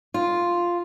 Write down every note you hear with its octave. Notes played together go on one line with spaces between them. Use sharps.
F4